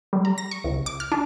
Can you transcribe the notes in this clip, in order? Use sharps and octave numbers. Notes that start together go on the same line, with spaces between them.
G3
A#5
A#6
C#6
C#2
D6
F6
D4